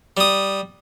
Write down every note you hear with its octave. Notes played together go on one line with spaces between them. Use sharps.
G3 D#6